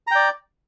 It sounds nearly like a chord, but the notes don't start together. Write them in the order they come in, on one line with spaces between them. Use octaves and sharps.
A#5 G5 D5